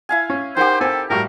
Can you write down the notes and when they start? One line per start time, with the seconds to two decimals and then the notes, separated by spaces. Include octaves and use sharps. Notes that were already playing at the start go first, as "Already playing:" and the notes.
0.09 E4 F5 G#5
0.30 C#4
0.57 D#4 G4 A#4 C5 F#5 G5
0.81 C4 A4 G#5
1.10 A2 G3 F#4 A#4 F5